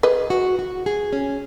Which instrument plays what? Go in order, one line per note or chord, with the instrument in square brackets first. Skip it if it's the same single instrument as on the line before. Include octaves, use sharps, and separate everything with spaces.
[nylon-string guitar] G#4 [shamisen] B4 D#5
[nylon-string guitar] F#4
F#4
G#4
C#4